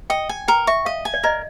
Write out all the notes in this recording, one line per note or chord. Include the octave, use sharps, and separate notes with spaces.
D#5 G5
G#5
A#4 G5
E5 C#6
D#5 F5
G#5
D5
A#4 D#5